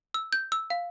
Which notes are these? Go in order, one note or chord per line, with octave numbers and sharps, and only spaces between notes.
E6
G6
E6
F5